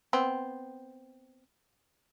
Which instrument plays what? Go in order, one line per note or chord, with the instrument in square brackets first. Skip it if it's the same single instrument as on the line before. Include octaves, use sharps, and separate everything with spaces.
[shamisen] B3 C4